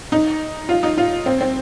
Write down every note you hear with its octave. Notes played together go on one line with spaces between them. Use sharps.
D#4
F4
D#4
F4
C4
C4